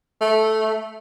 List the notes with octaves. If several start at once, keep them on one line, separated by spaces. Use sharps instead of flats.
A3